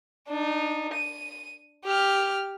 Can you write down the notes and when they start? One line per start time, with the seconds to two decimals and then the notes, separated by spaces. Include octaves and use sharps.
0.28 D4 D#4
0.94 D#7
1.85 G4 F6